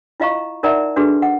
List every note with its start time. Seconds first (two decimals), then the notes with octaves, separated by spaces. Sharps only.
0.20 E4 F4 D#5 F5 A#5 C#6
0.63 D#4 A#4 D5 E5 F#5 A#5
0.96 D4 F#4 G#4 A4 B4
1.22 F#5